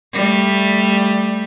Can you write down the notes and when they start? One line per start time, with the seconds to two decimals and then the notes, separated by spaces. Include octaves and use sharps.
0.13 G3 A3